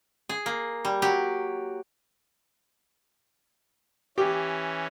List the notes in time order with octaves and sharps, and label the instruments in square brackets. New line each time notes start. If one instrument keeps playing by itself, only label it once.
[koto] G#4
A#3
G3
F#3 G4
[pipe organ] E3 C#4 [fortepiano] G4